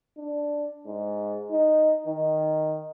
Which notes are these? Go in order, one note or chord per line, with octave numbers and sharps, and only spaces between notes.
D4
G#2
D#4
D#3